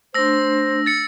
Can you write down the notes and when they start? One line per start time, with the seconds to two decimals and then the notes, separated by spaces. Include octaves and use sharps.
0.14 A3 D4 C5 E6 A#6
0.86 A6 C#7